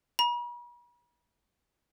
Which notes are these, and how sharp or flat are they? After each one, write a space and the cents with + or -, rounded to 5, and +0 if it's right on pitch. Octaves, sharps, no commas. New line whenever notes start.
B5 -45